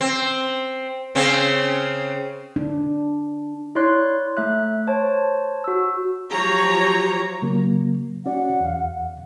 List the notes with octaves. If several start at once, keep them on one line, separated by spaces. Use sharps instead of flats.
C4
C#3 C4 C#4
D4
E4 C#5 D5 C6 F#6
A3 E5 F#6
C5 C#5 A5
F#4 E6
F3 F#3 G4 C#5 A#5
C#3 F#3 A#3
C#4 F#4 D5 F#5
E2 F5